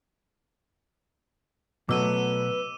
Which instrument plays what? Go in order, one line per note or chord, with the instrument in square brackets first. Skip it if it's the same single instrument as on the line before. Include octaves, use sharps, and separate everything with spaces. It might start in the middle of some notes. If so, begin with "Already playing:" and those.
[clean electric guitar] B2 [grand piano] F#3 A3 [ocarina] B4 [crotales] D6 E6 D#7